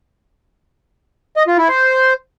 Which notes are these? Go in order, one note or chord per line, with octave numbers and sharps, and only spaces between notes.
D#5
F4
E4
C5